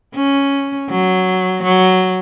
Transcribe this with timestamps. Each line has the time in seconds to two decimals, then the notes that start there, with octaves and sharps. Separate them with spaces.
0.15 C#4
0.90 F#3
1.63 F#3